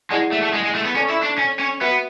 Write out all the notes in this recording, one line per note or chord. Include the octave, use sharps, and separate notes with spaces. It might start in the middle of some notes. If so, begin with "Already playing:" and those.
G#3 E4 G#4 D5 F#5 A5
A3
A3
G#3
G#3
A3
B3
C#4 A4 D5 A5 C#6
E4
D4
C#4
C#4
B3 F#4 B4 E5